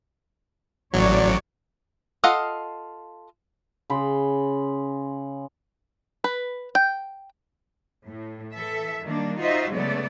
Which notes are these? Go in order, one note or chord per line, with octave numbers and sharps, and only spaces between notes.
A1 F#3 C#5 D5
F4 A4 D#5 F5 F#5
C#3 B5 C6
B4
G5
A2
E3 A4 E5
D#3 G3 A#3 D4
D#4 F4 F#4 C5 D#5 E5
C#3 F#3 G#3 A3 B3 D5